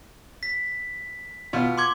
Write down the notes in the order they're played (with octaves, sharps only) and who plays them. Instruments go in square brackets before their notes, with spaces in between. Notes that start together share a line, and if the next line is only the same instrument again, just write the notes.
[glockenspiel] B6
[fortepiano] B2 F4
[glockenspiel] C6 D6 G#6